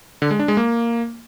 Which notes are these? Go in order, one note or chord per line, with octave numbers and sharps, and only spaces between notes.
D3
G#3
D4
G#3
A#3